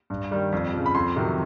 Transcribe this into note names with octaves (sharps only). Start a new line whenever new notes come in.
G2
D#3 G3
F2
C#3 F3
B5
F2 C6
C3 D#3 F#3